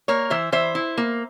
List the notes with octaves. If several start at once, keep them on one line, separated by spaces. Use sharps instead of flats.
A#3 A#4 C#5
E3 C5 E5
E3 C5 E5
E4
A#3